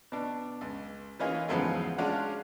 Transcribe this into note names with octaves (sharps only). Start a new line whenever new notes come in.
B2 D4
C#2
E3 A#3 C#4 D#4 F4 G#4
E2 G#2 C#3 F3 F#3 B3
G#3 C#4 D4 F4 F#4 F#5